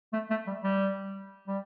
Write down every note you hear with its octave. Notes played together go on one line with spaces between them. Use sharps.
A3
A3
G3
G3
G3